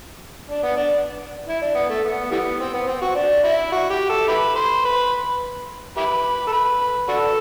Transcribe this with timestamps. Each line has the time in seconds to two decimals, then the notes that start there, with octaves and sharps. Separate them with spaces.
0.50 D4
0.63 B3
0.77 D4
1.48 E4
1.61 D4
1.75 B3
1.89 A3
2.04 B3
2.31 E3 G3 B3
2.60 C4
2.74 B3
2.87 C4
3.01 F#4
3.15 D4
3.43 E4
3.72 F#4
3.90 G4
4.10 A4
4.28 E4 G4 B4
4.56 C5
4.85 B4
5.97 E4 G4 B4
6.47 A4
6.52 B4
7.08 D4 F#4 A4